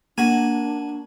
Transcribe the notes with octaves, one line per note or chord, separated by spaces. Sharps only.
A#3 D4 F#4 G#5